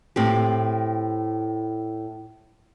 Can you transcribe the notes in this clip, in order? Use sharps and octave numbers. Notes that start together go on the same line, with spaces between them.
A2 C4 G4